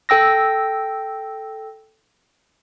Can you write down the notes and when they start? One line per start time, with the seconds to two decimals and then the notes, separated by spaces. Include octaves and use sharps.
0.09 A4 G5 E6 A#6